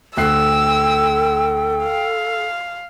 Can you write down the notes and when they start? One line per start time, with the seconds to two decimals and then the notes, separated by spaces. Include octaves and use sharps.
0.17 D2 A4 G5 E6 F#6 C7
1.84 F5